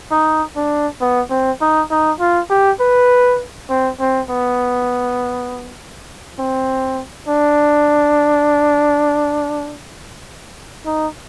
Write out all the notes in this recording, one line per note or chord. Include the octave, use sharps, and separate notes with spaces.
D#4
D4
B3
C4
D#4
D#4
F4
G4
B4
C4
C4
B3
C4
D4
D#4